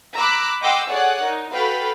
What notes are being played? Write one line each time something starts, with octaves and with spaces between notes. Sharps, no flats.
A#5 B5 D6 E6 F#6
D#5 F#5 G5 C6 D6 E6
G#4 A4 C#5 D5 F#5
D#4 A#4
F#4 A4 B4 F5 G5 B5